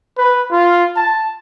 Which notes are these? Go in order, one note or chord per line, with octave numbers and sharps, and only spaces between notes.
B4
F4
A5